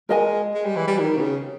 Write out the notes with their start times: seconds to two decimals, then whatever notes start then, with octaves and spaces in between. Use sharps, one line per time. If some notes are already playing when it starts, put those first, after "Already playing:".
0.09 G#3 A#4 D#5 G#5
0.54 G#3
0.65 G3
0.76 E3
0.87 G3
0.99 D#3
1.17 B2
1.21 C#3